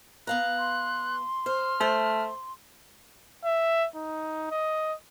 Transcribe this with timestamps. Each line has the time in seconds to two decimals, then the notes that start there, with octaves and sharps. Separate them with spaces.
0.27 B3 F5 A#5 F#6
0.59 C6
1.46 C5 F6
1.81 A3 C5
3.45 E5
3.95 D#4
4.51 D#5